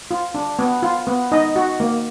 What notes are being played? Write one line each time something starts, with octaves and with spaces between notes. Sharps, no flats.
F4
D4
B3
F4
B3
D#4 D#5
F#4
A#3